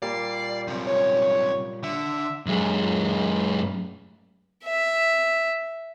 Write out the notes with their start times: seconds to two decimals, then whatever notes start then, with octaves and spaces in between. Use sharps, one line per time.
0.02 A#2 G3 A#3 D5 C7
0.68 F#2 C3
0.87 C#5
1.84 D3 E5
2.46 F#2 G#3
4.64 E5